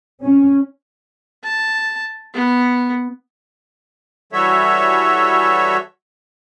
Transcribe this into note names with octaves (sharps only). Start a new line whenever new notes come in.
C#4
A5
B3
E3 G3 F#4 A4 C#5 E5